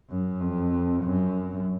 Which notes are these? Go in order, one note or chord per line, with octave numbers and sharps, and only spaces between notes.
F#2
F2
F#2